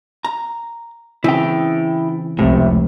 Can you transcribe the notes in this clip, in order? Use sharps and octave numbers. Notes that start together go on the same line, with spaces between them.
A#5
C#3 E3 C4 E4 G5
F1 C#2 A2 C3